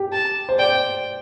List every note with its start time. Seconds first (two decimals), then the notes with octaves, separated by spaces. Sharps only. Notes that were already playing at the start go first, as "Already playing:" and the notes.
Already playing: G4
0.13 A5
0.49 C5
0.59 D5 G5